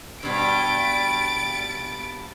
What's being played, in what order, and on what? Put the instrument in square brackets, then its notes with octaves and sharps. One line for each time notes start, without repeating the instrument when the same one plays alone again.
[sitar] G2 B2 [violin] A6 D7